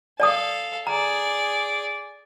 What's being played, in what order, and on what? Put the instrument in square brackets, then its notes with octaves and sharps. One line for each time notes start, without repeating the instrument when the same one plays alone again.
[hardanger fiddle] A4 F5 [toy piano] D5 A5 D#6
[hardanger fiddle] G#4 D5 [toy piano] A#5